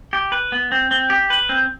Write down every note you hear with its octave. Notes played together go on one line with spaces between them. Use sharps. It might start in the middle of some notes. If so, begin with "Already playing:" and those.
G4
B4
B3
C4
C4
G4
B4
C4